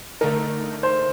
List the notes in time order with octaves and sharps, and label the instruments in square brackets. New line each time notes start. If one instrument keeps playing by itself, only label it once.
[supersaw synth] D3 A3 D#4 [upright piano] A#4
[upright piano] C5